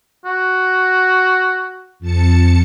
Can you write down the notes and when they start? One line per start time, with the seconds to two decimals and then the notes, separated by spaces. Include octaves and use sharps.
0.25 F#4
2.00 F2 A5 C#7